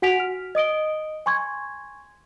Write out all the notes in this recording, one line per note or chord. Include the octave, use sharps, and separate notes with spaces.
F#4 F#5 G#5 B6 D7 F7
F6
D#5 D#6 D7 G7
G#5 C6 C#6 G#6